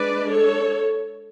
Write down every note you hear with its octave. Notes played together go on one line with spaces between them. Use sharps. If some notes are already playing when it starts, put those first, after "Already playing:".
Already playing: G#3 D4 B4 D5
A4 C#5